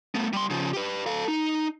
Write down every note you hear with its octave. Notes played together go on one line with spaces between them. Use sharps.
A3 B3
G3 C6
C#3 F3
G4 B4
A4 F5
D#4